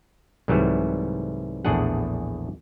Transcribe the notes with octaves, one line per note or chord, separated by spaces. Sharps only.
C2 G#2 E3 F#3 G3 A3
A#1 E2 A2 D4 G#4 F#5